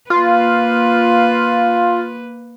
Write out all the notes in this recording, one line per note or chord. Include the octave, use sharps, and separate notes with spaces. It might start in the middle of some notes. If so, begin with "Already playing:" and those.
A#3 F4 B4